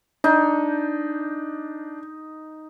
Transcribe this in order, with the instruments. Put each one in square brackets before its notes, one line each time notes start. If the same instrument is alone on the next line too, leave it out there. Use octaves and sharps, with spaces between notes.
[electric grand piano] D4 [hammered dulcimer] D#4